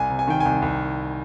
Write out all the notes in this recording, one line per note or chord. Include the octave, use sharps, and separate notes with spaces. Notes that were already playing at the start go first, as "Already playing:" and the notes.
Already playing: C2 G#5
C3
G#5
D#3 G5
G#5
C2
C2